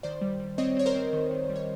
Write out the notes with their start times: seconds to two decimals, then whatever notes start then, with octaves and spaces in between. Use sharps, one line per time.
0.03 D#3 C5 D5
0.21 G3
0.40 G3
0.58 C4 C#5 D#5
0.77 C4 C#5
0.86 A#4 C5
0.95 C4
1.13 D#3
1.31 D#3
1.49 G3
1.56 C#5